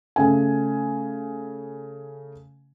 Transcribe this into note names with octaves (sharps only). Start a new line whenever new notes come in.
C#3 A3 G#5